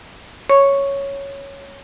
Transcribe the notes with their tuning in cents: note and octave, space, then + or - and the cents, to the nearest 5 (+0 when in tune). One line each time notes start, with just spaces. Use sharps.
C#5 +0 C#6 +0